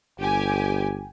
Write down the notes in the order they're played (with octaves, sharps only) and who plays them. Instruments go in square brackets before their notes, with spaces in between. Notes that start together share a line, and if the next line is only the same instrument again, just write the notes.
[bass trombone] G1 [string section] G4 G#5